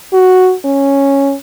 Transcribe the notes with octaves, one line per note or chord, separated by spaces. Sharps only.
F#4
C#4